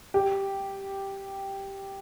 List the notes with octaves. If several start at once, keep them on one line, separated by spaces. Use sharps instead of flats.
G4